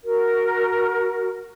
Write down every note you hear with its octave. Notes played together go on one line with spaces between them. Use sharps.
F#4 A#4